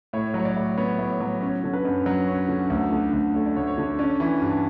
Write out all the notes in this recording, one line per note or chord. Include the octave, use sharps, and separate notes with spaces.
A2 C#5
F#3 C#5
D5
A2
B3 C#5
A2
F#3
C#4 C#5
D3
B4
F#2
F#3
C#4
D3
D2
D3
D2
A3 C#5
D5
D2 C#5
C#5
D3
C#4 D5
E3
G2